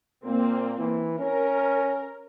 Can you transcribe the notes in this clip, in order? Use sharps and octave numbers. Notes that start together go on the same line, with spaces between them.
A#2 A#3 C4
E3
C#4 A#4